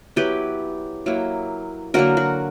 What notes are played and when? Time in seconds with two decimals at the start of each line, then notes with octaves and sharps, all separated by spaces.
0.16 F#3 B3 E4 G4 B4
1.06 F#3 A#3 E4
1.94 D3 F#3 A#3 F#4 A#4
2.17 F#4